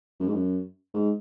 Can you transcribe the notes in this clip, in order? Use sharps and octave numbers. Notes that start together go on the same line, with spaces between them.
F#2
G#2
F#2
G#2